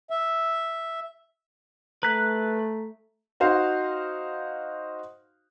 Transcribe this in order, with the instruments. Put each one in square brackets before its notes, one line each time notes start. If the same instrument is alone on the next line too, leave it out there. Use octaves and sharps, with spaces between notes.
[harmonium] E5
[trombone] A3 [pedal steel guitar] B4 F#6 [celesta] A#5 B6
[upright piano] D#4 F#4 C5 F5